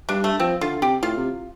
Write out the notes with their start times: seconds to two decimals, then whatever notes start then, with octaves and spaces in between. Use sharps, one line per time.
0.09 G2 D4
0.24 A3
0.40 F3 C4
0.61 D3 F4
0.81 C3 G4
1.02 A2 F4
1.17 C3